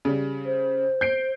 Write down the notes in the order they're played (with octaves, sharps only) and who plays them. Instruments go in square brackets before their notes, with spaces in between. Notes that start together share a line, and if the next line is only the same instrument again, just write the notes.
[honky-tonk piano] C#3 G3
[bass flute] C5
[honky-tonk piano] G6 C7 D7